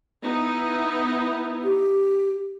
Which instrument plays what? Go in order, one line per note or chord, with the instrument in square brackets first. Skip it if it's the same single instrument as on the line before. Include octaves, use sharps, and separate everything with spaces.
[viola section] B3 D#4 E4
[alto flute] G4